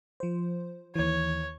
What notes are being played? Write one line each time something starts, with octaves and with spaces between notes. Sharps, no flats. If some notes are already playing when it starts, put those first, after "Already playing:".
F3 C5
D#2 E3 C#5